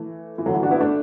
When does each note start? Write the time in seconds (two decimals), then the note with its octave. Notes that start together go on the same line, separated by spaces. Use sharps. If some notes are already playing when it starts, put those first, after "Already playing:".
Already playing: E3 A3
0.38 E3
0.46 D3 F#3
0.54 E3
0.63 D4 F#4
0.71 B3 E4
0.81 A3 D4